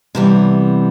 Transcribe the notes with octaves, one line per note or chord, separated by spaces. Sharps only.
C3 E3 G3 B3